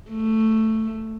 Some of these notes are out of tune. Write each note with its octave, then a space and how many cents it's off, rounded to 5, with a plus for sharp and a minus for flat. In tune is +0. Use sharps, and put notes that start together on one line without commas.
A3 +5